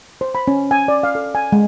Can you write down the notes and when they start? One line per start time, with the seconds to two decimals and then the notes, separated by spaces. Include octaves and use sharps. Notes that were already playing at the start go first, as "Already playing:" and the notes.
0.21 C5
0.35 B5
0.48 C#4
0.71 G#5
0.88 D5
1.03 F5
1.15 A4
1.35 G#5
1.52 G#3